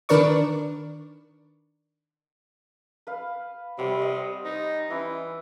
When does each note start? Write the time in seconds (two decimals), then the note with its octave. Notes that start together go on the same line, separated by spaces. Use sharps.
0.09 D#3 D4 A#4 B4 D5 C#6
3.07 B4 F5
3.78 C3 G3 C#5 F#5
3.99 C5 D#5
4.45 D#4 C5
4.90 E3 C#4 E4